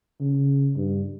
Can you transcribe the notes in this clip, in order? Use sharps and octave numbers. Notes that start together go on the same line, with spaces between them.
C#3
G2